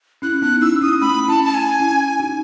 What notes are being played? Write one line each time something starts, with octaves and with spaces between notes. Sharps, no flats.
C#4 E4 F#6
B3 D#4 F#6
C#4 E4 E6
C#4 E4 D#6
A3 C#4 B5
C#4 E4 A5
A5
G#5
C#4 E4
D#4 F#4